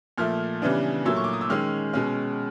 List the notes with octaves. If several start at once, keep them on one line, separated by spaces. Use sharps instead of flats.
A#2 F3 A3 F6
C#3 E3 G3 B3 D4
A#2 F#3 A3 E6
C#6
D6
D#6
E6
D#3 G#3 C#4 F6
B2 G#3 C#4 F6